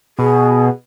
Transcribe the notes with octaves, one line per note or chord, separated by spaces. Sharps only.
B2 G#4